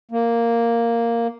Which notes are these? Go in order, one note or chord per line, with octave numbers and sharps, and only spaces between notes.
A#3